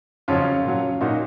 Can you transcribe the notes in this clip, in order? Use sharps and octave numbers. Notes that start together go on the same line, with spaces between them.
F2 C#3 F#3 C#4 F4
A#2 F#3
A#2 F#3 D#4 F#4